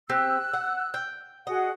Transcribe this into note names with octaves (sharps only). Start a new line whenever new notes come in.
C4 G4 E6 F#6
F#5
G5
F#4 G#4 D#5 F#5